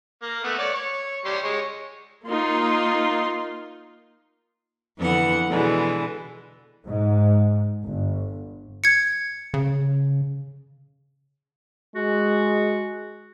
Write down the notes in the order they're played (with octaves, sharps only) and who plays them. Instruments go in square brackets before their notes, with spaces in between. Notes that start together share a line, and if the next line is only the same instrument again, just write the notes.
[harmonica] A#3
A3 B3
C#5 D5
C#5
G3 C#5 C6
G#3 C#5
[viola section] A#3 D#4 F4 C6
[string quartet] F2 D3 E3 B3 F#5
B2 D3 E3 G#3
[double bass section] G#2
G1
[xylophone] G#6 C#7
[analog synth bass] C#3
[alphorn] G#3 [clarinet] F#4